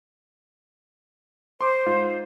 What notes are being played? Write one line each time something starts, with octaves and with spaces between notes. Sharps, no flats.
C5 C6 D6
G#2 F4